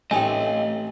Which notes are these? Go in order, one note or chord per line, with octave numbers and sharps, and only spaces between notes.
A1 A3 C4 D#4 C#5 D#5 G5 G#5